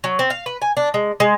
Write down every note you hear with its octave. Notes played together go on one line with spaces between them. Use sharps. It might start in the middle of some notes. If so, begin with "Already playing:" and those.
F#3
C4
F5
B4
G#5
D4
G#3
G#3